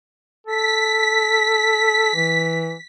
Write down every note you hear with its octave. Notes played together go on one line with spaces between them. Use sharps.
A4 B6
E3